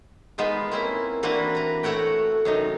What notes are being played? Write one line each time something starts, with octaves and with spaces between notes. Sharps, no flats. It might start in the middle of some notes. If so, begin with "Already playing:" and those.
G#3 B3 D#4 F4
A#3 C4 C#4 E4
E3 A#3 C4 D4 F#4 B4
B4 A#5
A3 F#4 A4 C#5 F#5 G5
F#2 C3 D#4